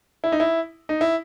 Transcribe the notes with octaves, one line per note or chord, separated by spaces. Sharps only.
E4
D#4
E4
D#4
E4